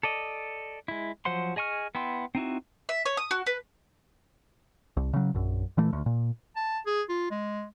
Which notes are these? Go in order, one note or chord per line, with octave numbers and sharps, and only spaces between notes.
A4 D5 D#5
G#3 E4
F3 F#3 C5 F#5 C6
G#4 D#5 G#5 C#6 F6
B3 E4 G5 C6
C4 D#4 E4 F#4
E5
C#5
D#6
F#4
B4
C2
C#3 F#3
A#1 F#2
A#2 E3 A3
D2
A#2
A5
G#4
F4
G#3